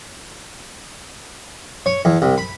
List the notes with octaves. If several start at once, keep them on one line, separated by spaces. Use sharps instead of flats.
C#5
E2
C2
B5